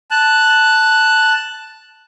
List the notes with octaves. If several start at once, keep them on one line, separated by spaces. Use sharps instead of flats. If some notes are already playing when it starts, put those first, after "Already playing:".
A5 F#6